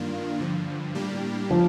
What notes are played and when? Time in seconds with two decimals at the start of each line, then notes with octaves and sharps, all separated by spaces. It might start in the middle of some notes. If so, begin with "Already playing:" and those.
Already playing: G2 D#3 A#3 D4 F4
0.39 G2 D3 F3
0.95 A2 G3 A#3 D4 G4
1.50 F3